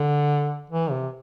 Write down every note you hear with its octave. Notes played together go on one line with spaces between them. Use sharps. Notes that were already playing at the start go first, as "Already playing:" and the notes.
Already playing: D3
E3
C3